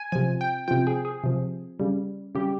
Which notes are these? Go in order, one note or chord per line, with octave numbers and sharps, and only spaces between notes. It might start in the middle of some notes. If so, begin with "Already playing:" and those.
Already playing: G#5
C3 F3 G#5
G5
C3 F3 G5
G#4
G#4
C3 F3
C#3 G3
C#3 G3 G4